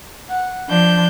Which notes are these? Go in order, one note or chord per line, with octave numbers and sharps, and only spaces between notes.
F#5
F3 D4 G6